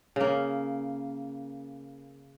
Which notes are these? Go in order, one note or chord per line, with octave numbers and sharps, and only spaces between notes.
C#3 A#3